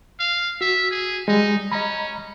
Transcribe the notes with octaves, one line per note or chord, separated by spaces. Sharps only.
F5
F#4 E5
G#4
G3 G#3 D#4
C#4 D#5 A#5 B5